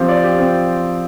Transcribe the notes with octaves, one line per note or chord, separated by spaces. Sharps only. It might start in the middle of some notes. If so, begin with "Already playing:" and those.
Already playing: F3 C4 G4
D5
G4
C4